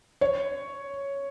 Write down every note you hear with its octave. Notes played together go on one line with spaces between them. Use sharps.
C#5